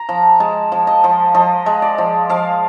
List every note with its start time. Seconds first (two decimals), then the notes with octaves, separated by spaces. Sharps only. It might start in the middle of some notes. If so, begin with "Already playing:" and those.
Already playing: A#5
0.09 F3
0.40 G#3 A5
0.72 F3
0.87 D#5
1.04 F3
1.34 F3 D#5
1.66 G#3
1.82 D5
1.98 F3
2.30 F3 F5